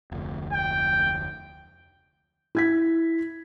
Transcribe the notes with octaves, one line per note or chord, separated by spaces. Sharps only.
F1 D2
G5
E4 G#6 B6